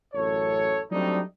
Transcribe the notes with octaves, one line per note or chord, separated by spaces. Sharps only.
A1 F#2 A4 C#5
F#3 G3 A3 C4 D4 D#4